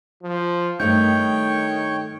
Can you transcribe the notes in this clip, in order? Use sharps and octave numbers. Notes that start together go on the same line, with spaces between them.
F3
G2 D#3 A3 D#4 C#5 G5 C#6 G6